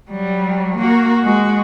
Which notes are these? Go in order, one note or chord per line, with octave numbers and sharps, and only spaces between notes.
F#3 G3
A#3 F#4
G#3 F#4